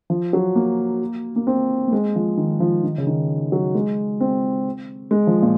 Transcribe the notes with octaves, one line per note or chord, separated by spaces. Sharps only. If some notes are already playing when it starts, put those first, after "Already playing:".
F3
F#3
A#3
A#3
C4
A#3
G#3
F3
D#3
F3
D#3
C#3
D#3
F#3
G#3
C4
G#3
F3
A#2